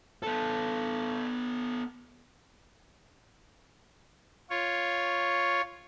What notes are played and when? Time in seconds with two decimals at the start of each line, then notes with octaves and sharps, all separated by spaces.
0.23 B3 A4
4.50 F4 C#5